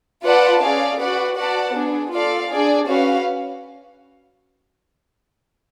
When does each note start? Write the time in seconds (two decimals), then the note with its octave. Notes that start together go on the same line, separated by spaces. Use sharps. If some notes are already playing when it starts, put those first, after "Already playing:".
0.24 F4 B4 D5 F#5 A5
0.62 C#4 G#4 D5 F5
1.00 F#4 B4 D5 F#5
1.38 F#4 B4 D5 F#5 A5
1.74 B3 D4 G#4
2.13 F4 A4 D5 F5
2.50 D4 G#4 D5
2.87 C#4 F#4 B4 F5